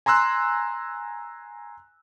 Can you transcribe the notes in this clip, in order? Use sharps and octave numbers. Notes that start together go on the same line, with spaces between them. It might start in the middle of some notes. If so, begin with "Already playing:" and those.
G#5 A#5 C6 E6 F#6